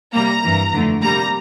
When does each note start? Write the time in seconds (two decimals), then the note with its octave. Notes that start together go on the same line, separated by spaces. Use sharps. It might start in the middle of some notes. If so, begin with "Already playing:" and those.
0.13 C3 G3 A#3 A#5
0.43 G2 E3 A#3
0.72 F2 D3 A3
1.02 C3 G3 A#3 A#5